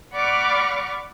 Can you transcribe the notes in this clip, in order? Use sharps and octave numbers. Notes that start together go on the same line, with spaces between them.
D5 F#5 B5 C#6 D6 F6